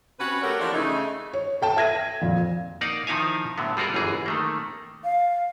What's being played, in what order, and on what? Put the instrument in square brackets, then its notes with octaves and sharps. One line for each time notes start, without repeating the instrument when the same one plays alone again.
[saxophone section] C3 C#4 F#4 B4
A3 F#4 G4 A4 A#4 C#5
E3 F3 A#3 D4
C#3 A3 D#4
[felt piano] C#5
A4 G5 A5
E5 G#6 A#6 D#7
F2 A#2
[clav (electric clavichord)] A#3 D#4 D5 F5 F#5
D#3 F3 D#4 E4 F5 G#5
A2 D3 F#3 B3
G3 F4 F#4 G#4 A#4
G1 F#2 E3 G#4
D#3 A3 A#3
[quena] F5